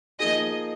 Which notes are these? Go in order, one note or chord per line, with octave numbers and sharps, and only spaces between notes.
F3 A#3 D#4 G#4 D#5